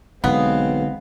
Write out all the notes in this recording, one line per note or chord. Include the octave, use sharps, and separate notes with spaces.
B1 D3 G#3 B3 C4 F5